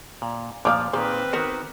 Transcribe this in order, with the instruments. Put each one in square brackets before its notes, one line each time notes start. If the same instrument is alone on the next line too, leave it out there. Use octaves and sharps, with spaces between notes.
[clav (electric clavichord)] A#2
[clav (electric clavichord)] A#2 F3 [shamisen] C#5 D5 F5 [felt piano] D6 F6
[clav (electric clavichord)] A#2 D#3 [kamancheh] C4 B4 [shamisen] G#4 C5
[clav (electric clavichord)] D#3 F#4 [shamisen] B3 A#4